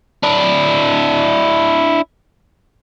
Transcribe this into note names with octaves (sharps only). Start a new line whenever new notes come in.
D4 E4